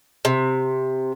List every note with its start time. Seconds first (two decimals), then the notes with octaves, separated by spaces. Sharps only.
0.25 C3